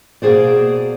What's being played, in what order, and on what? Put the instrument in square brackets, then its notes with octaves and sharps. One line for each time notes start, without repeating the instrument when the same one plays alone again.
[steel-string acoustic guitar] B2 A#3 F4 G#4 C5 D5